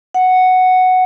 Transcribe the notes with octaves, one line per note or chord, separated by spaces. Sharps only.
F#5